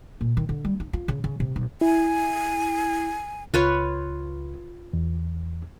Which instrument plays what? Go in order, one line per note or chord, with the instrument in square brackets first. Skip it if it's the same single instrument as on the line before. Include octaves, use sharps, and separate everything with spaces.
[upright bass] A#2
D#3
D3
G3
D#4
F4
C#3
C#3
C3
B1
[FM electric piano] E4 [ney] G#5
[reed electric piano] C#2 [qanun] F4 B4 C#5
[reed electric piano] E2